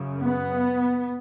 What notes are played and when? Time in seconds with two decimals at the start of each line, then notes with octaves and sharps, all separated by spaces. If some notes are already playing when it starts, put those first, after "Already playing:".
Already playing: F#2 C#3
0.22 B3